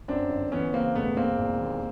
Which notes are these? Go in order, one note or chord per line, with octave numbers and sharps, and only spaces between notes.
F#2 C4 D4
G1
E3 B3 C#4
C#3 A#3 C4
E1 A3 B3
E1 A#3 C4
E1
D#2